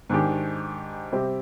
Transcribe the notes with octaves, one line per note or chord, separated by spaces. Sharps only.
G#2 D#3 G#3 D4 G4
C3 G3 C4 G4